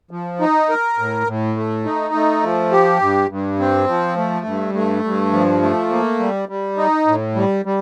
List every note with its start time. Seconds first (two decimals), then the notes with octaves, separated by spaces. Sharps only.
0.11 F3
0.40 D#4
0.69 A#4
0.99 A2
1.27 A2
1.57 A3
1.85 D#4
2.14 A3
2.43 F3
2.72 G4
3.01 G2
3.30 G2
3.60 C4
3.88 F3
4.17 A3
4.46 G2
4.74 A3
5.04 G2
5.33 F3
5.62 A3
5.91 A#3
6.19 G3
6.49 G3
6.77 D#4
7.07 A2
7.35 G3
7.65 G3